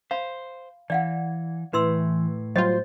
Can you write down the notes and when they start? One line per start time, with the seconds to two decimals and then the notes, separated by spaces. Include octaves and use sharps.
0.11 C5 F5 B5
0.90 E3 D5 F5 F#5
1.73 A2 E3 B4 C6 E6
2.56 F#3 G3 F4 C5 D#5